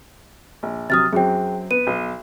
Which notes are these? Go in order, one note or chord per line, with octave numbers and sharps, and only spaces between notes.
A#1
C3 F#3 D#6 F6 A6
F#2 F#3 C4 G#4 G5
B3 B4 D#7
B1